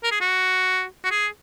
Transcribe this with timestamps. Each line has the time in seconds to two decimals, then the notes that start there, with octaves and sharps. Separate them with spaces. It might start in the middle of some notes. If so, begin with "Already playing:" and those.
0.04 A#4
0.11 G#4
0.21 F#4
1.04 F#4
1.11 G#4